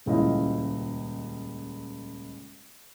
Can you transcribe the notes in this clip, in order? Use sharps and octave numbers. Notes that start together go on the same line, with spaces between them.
D#1 C#2 E4 F4 D#5 F5